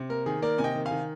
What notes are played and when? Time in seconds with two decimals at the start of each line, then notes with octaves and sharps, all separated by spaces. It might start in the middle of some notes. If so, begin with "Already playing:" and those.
Already playing: C3
0.09 A#3 A#4
0.26 D#3 G#4
0.42 A#3 A#4 D5
0.58 C3 G#5
0.64 D#5 G5
0.75 D#3
0.85 F5 G#5
0.91 D#3